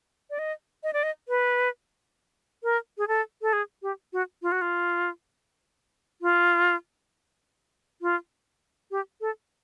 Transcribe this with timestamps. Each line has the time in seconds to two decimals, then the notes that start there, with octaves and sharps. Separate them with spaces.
0.30 D5
0.39 D#5
0.83 D#5
0.93 D5
1.03 D#5
1.29 B4
2.63 A#4
2.98 G#4
3.08 A4
3.42 A4
3.53 G#4
3.82 G4
4.13 F#4
4.42 F4
4.52 F#4
4.61 F4
6.22 F4
8.02 F4
8.91 G4
9.21 A4